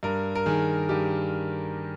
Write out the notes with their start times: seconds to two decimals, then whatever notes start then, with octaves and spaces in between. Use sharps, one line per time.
0.03 G2 A#4
0.35 A#4
0.46 D#3 G#4
0.89 G2 G4